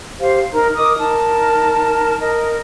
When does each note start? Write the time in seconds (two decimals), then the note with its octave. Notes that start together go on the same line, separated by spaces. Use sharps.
0.19 G4 C5 F5
0.53 D#4 A#4 A#5
0.77 A#4 D#5 D6 D#6
0.98 D#4 A#4 A5
2.20 A#4 D#5